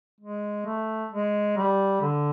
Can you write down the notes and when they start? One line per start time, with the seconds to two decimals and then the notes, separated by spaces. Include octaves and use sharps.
0.21 G#3
0.66 A3
1.12 G#3
1.57 G3
2.02 D3